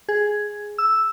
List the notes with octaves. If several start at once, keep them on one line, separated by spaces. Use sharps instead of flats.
G#4
E6